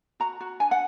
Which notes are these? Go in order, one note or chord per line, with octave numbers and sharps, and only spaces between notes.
F#4 A#5
F#4
D4 G#5
F#5